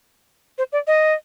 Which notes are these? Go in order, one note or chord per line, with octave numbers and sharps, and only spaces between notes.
C5
D5
D#5